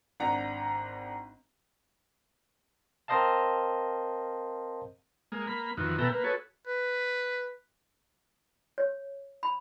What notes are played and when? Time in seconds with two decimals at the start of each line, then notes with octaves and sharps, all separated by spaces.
0.20 G#1 D4 F#5 A#5
3.08 C4 A#4 C5 D#5 F5 A5
5.32 G#3 A#3
5.47 A#3 B5
5.77 F2 D#3 E3 F#4
5.99 B2 B3 A4 E5 G5 A#5
6.12 A#3 B4
6.24 F#4 G#4 A4 B4 C#5
6.67 B4
8.78 C#5
9.43 B5